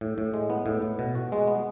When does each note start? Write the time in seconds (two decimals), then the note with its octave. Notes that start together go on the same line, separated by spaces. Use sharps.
0.01 A2
0.18 A2
0.34 G#3
0.50 B3
0.66 A2
0.82 A2
0.99 B2
1.15 F#4
1.32 G#3
1.47 B3